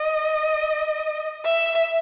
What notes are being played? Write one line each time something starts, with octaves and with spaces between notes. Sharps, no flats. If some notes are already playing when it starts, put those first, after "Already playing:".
Already playing: D#5
E5